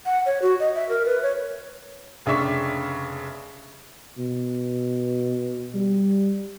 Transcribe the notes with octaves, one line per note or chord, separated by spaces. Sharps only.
F#5
C#5
F#4
D#5
E5
A#4
B4
C#5
F1 C#3 D4 E5 C#6 B6
B2
G3